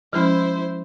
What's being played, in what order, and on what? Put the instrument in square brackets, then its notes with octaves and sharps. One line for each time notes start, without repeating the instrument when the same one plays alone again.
[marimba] F3 G#3 C#4 [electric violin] E4 C5